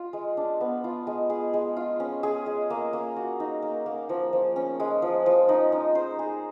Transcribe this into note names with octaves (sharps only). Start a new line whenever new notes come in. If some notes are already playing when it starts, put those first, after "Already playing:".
Already playing: F4
G#3
D4
B3
F4
G#3
G#4
G#3
F4
C#4
G#4
G#3
A#3
A#3
F#4
D#4
A#3
A#3
F3
F3
C#4
G#3
F3
F3
D#4
D#4
C5
G#4